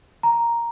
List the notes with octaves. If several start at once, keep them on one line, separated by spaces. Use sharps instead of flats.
A#5